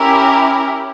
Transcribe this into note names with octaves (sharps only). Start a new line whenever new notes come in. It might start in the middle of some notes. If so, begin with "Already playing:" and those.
Already playing: C#4 E4 G4 A#4